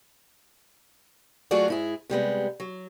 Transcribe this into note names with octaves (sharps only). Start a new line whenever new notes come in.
F#3 A3 F4 F#4 G#4 D5
G#2 E4 G#4
C3 G3 G#3 B3
F#3